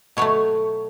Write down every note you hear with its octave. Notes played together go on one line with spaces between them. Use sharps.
B2 F#3 A3 C#5